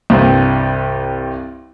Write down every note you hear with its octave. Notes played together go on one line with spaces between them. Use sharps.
C2 G2